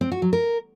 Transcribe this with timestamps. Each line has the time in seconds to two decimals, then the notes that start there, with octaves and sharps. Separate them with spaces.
0.01 C4
0.12 F#4
0.22 F#3
0.33 A#4